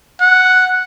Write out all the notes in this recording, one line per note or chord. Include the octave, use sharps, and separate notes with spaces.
F#5